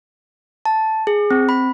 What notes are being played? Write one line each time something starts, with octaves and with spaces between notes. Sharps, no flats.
A5
G#4
C4
B5